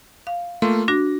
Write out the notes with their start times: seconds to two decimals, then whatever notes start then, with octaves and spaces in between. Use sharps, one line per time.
0.27 F5
0.62 A3 A#3 F4 C6
0.88 D4 F#4 A#6